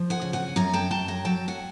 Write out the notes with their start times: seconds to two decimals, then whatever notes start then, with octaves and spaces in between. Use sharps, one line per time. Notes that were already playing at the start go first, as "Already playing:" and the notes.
Already playing: F3
0.10 F#5 G#5
0.22 C#3
0.33 F#5 G#5
0.56 F#2 G#5 A#5
0.73 G5 A5
0.91 F#2 G5 A5
1.08 G#5 A#5
1.25 F#3 G5 A5
1.48 F#5 G#5